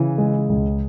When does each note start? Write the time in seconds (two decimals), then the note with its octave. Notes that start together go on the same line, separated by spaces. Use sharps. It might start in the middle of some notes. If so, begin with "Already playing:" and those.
Already playing: C#3 E3
0.18 G#3
0.49 C#2